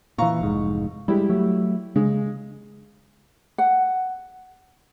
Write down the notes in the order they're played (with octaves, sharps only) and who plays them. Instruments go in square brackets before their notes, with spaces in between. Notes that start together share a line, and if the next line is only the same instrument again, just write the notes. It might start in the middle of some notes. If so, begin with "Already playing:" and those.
[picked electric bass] A#2 E3 [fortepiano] F5 A#5 C#6
[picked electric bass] F1 G#2
[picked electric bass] G3 G#3 [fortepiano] E4 G4
[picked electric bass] F#3 A3
[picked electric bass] C#3 [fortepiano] G#3
[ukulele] F#5